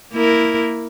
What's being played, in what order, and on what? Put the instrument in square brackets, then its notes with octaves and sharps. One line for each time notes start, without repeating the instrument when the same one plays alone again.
[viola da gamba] A#3 E4 A#4